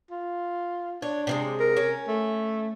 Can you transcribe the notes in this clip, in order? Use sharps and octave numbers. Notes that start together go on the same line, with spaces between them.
F4
D4 C#5
C3 E3 G#3
A#4
C#4
A3